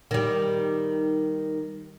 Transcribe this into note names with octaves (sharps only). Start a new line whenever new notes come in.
D#3 G3